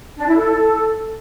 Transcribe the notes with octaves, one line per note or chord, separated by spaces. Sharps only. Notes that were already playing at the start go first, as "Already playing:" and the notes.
D4
E4
A4